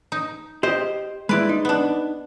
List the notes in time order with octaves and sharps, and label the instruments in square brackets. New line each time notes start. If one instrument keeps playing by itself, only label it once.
[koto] D#4
[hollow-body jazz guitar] G4 D#5 [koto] C5
[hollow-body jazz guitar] G#3 E4 [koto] B4 D5
[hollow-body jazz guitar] D#4
[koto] B3 D4